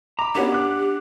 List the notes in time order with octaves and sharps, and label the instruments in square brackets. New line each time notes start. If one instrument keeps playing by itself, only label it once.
[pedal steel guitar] A#5 [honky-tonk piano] B5 D6
[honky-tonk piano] A#3 B3 C#4 [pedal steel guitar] D4 F#5 [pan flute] G4
[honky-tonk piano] D6 F#6